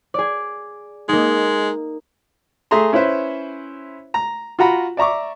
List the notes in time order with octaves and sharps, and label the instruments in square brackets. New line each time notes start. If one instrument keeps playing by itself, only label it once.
[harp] G#4 D5
[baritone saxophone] G#3 [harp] A#3 D#4
[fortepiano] A3 G#4 E5 A#5 C6
C#4 E4 B4 C5 E5
A#5
F4 F#4 F#5 A#5 B5
D5 E5 A#5 C#6 D6